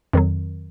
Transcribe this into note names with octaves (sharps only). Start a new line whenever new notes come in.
F2 D#3 F#3